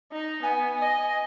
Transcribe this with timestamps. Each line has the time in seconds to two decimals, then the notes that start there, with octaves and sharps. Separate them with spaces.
0.12 D#4
0.43 B3 G#5
0.79 D#5